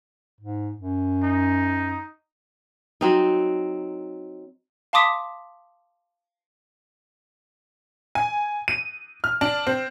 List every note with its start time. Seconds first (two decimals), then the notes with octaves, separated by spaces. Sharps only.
0.41 G#2
0.77 F#2
1.24 D#4
3.01 F#3 C4 D#4
4.93 F5 A5 C6 D6 D#6 B6
8.15 G#5
8.68 D#7
9.24 F6
9.41 D4
9.67 C4